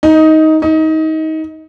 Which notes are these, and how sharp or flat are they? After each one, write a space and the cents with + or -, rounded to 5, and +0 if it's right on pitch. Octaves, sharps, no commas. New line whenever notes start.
D#4 +15
D#4 +25